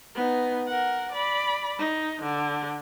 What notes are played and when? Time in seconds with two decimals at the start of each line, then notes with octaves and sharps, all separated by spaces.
0.15 B3 D#4
0.67 A#4 F#5
1.12 D5 B5
1.79 D#4
2.22 D3